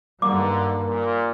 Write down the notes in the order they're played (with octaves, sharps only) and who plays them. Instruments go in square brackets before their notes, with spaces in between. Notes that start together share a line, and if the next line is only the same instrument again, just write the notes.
[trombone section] B1 D3 [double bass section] G2 D#3 G3 [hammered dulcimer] A#3 [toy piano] D6
[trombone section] A#2